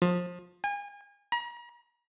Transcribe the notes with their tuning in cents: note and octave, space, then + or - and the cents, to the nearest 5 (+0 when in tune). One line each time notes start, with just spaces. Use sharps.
F3 +25
G#5 -35
A#5 +40